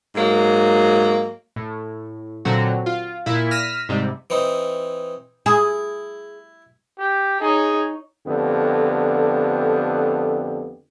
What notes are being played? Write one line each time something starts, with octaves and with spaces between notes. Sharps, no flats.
G#2 F#3 A#3
A2
A#2 D3 F#3 C4 F#4
F4
A#2 E4
F6 A#6 B6 D#7 E7
G#2 C3 G3
E3 C4 D#4
E4 G#4
G4
D#4 G#4 C#5
F2 D3 A3 B3 G4